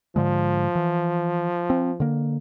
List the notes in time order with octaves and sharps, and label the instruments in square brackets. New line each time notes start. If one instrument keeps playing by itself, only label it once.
[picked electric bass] G#2 D3 G#3 [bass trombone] F3
[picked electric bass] E3
C4
D3 A#3